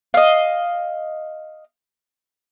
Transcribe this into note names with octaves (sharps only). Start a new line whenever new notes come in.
D#5 F5